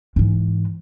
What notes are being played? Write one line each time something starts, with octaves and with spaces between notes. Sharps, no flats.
G#2 E3